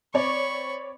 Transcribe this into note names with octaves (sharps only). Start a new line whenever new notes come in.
C4 C#5 D5 B5 C#6